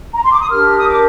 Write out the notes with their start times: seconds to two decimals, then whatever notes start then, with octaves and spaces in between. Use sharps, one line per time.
0.13 A#5
0.23 C6
0.31 D6
0.41 D#6
0.50 D4 G4 A#4 F6
0.78 D#6
0.89 D6